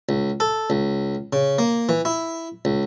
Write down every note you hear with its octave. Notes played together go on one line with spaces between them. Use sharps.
C#2
A4
C#2
C#3
A#3
E3
E4
C#2